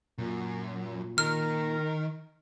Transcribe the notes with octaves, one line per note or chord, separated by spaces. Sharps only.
F#2 A#2
D#3 A#4 F6